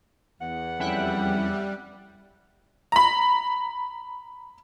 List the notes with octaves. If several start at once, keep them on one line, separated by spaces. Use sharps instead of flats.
E2 F#5
F2 G3 C#4 E4 E5 G5 F#6
A#5 B5